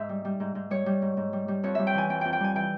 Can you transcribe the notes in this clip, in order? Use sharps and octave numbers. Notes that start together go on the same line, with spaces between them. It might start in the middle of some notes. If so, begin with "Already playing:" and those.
Already playing: G#2 E5
G3
G3
G#2
G#2
G3 C#5
G3
G#2
G#2
G3
G3
F2 C#5
G3 E5
G5
E3 G#5
F2 G5
F2 G5
G5
G3 G#5
E3 G5